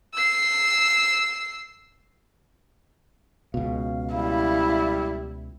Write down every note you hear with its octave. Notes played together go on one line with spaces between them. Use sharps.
E6 C7
C#2 B2 F5
G3 E4